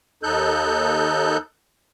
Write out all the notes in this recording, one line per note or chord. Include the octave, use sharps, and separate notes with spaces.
D#2 D#4 A4 F#6 G6